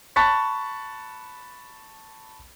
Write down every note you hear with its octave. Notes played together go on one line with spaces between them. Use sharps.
A5 B5 C#6 F#6 A6 B6